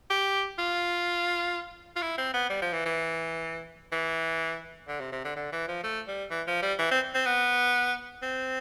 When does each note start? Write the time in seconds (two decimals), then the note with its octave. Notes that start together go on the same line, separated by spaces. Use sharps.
0.10 G4
0.59 F4
1.96 F4
2.02 E4
2.18 C4
2.34 B3
2.50 G3
2.62 F3
2.73 E3
2.85 E3
3.92 E3
4.88 D3
5.00 C3
5.12 C3
5.24 D3
5.36 D3
5.52 E3
5.68 F3
5.84 A3
6.08 G3
6.31 E3
6.47 F3
6.62 G3
6.79 E3
6.91 C4
7.15 C4
7.26 B3
8.22 C4